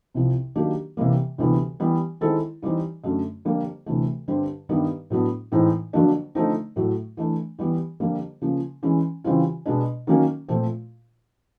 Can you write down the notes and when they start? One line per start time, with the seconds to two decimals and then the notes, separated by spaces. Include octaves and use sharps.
0.14 C2 C3 F3
0.56 D#3 F#3 A#3 D4 G4
0.97 C3 E3 G3 A#3
1.38 D2 C3 E3 G3 B3
1.80 E3 G3 B3
2.21 D#3 G#3 C4 E4 A4
2.62 E3 G3 C4 D#4
3.04 F#2 D3 F#3 A3
3.45 F2 D3 G3 A#3
3.86 D2 C3 E3 A3
4.28 G2 D3 G3 C4
4.69 G2 D#3 G3 B3 D#4
5.10 A2 F#3 B3 D4
5.52 A2 E3 G#3 C4 D#4
5.93 F2 D3 F#3 A#3 D4
6.35 D3 F3 A3 C4 D#4
6.76 A2 F#3 A3
7.17 E3 A3 D4
7.59 E3 G3 B3
8.00 F2 D3 G3 A#3
8.42 C#3 F3 A#3
8.83 E3 G#3 C#4
9.24 C#3 E3 G3 C4 F4
9.66 B2 G#3 B3 D4
10.07 D#3 F#3 A#3 C#4
10.48 A#2 F3 A3 C4 F4